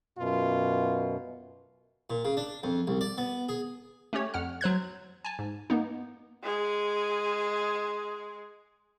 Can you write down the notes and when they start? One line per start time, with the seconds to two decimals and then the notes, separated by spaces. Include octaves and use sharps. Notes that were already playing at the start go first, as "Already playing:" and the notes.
0.19 F#2 B2 F4
2.10 A#2
2.25 C#3
2.37 D4
2.63 F2
2.87 C2
3.01 D5
3.18 B3
3.49 G#4
4.13 A3 C#4 G4 C#5
4.34 F2 F#5 F6
4.61 F#3 C5 F#6 G#6
5.25 G#5 A5
5.39 G#2
5.70 A#3 B3 D#4
6.43 G#3 G#4